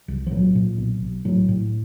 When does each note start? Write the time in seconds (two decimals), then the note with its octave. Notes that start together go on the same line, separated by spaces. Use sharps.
0.08 C2
0.27 F3
0.31 A#2 F#3
0.55 A#2
0.78 B1
1.02 B1
1.25 A2 F#3
1.49 A2